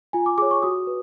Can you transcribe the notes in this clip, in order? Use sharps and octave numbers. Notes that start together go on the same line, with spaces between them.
F4 G#5
D6
G#4 C#5 D6
C#6
F#4 D#6
B4